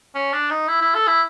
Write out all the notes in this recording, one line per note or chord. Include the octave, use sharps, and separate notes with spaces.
C#4
D4
D#4
E4
E4
A4
E4